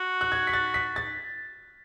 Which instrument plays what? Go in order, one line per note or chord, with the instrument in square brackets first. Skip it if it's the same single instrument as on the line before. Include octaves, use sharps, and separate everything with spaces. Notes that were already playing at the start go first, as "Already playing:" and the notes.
Already playing: [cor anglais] F#4
[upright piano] F#6
G#6
B6
A6
B6
A6